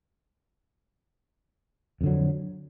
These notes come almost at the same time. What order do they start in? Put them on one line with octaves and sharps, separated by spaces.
F2 D3 F#3